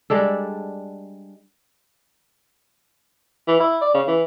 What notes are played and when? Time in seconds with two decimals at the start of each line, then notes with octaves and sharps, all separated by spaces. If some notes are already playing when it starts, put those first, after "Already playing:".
0.10 G3 G#3 D4 A4
3.48 E3
3.60 E4
3.82 D5
3.94 C#3
4.08 E3